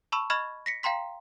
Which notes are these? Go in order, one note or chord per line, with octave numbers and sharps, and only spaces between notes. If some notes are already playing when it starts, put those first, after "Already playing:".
A5 B5 C#6 E6 E7
D#5 B5 C#6 F6 G#6 E7
A#6 B6 C#7
F5 G5 A#5 C6 B6